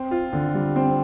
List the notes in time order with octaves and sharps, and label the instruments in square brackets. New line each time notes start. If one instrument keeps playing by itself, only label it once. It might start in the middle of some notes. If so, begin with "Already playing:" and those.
Already playing: [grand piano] C4
F4
D3
G3
C4